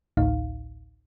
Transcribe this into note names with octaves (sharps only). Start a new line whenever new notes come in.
A1 D2 A2 D#4 F5